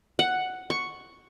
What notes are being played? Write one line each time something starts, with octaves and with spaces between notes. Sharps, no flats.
F#5
C#6